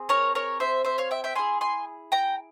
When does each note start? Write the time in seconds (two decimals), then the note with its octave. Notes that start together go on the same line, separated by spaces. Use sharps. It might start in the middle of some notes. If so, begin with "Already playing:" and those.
Already playing: C4 G#4
0.09 A#4 C#5
0.35 A#4 C#5
0.60 C5 E5
0.85 C5 E5
0.98 C#5 F5
1.11 E5 G5
1.24 E5 G5
1.36 C4 E4 G#4 G#5 C6
1.61 G#5 C6
2.12 G5 A#5